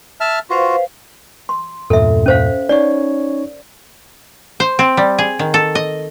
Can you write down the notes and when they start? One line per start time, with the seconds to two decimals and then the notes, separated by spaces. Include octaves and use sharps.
0.20 E5 A5 F6
0.50 F4 F#4 B4 C5 F5
1.49 C6
1.90 E2 G2 A#2 A4 E5
2.26 C#4 C5 F5
2.69 C#4 D#4 C#5 D5
4.60 C5
4.79 C4
4.97 G3
5.18 G#4
5.39 D#3
5.54 A4
5.75 D#5